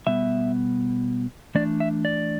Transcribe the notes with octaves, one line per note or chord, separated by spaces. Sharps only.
B2 G3 B3 E5
E3 A3 D4 D5
E5
D5